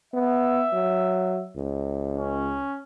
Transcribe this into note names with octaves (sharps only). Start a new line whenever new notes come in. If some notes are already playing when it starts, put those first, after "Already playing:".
B3 E5
F#3
C#2
C#4